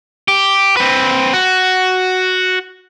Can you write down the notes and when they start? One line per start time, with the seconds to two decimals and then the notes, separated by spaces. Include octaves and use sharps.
0.28 G4
0.77 C4 B4
1.33 F#4